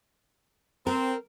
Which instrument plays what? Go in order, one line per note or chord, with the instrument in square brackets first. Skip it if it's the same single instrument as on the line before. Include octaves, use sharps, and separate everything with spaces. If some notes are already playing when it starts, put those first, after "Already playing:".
[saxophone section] C4 [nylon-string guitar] A#4